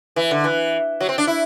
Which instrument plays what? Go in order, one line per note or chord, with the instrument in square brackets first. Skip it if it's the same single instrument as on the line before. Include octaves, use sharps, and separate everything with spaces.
[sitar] E3
D3
E3
F#3
C4
D4
E4